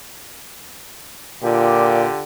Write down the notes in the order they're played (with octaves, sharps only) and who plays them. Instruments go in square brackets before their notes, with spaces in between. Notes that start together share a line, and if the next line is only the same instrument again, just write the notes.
[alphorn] A#2 [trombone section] D3 F4 G4